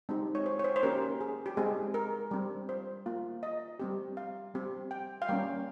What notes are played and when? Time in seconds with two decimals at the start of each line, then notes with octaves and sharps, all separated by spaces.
0.09 G#3 C4 D#4 G4
0.35 C#5
0.46 C5
0.59 C#5
0.64 C5
0.76 C5
0.83 A#3 C#4 G4 A#4
1.20 G#4
1.46 G4
1.57 G#3 C4 G4 G#4
1.94 A#4
2.31 G3 C4 G4
2.69 C5
3.06 A#3 F4
3.43 D#5
3.79 G3 C4 G4
4.17 F5
4.54 G3 C4 G4
4.91 G5
5.22 F5
5.29 G3 A#3 C#4 G5